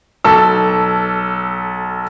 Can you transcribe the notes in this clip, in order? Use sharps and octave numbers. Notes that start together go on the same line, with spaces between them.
B1 A4 E6